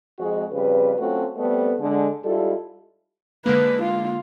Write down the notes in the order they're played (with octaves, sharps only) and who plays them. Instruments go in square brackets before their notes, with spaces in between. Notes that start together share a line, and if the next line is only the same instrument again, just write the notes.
[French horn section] F2 G#3 F#4
F2 C#3 G3 B4
F#3 A3 C4 C#4 F4 F#4
G3 A3 B3 C4 A4
D3 G#3
G#2 G3 E4 F4 A4
[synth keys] D3 G#3 A#3 [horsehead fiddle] B4
[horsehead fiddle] F4